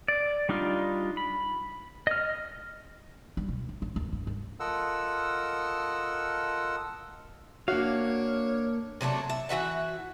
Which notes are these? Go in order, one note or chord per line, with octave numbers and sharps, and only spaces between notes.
D5
G3 D4 D#4 F4
B5
D#5 F6
G3
B2
B1
A1
D#2
G#2
G2
F4 A4 A#4 D#5 F#5 E6
A#3 D4 F#4 C#5 F5
C3 F#3 A3 D4
E5
E3 F#4 E5 F#5